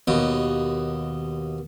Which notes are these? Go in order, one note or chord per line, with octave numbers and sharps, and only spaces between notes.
D#2 B2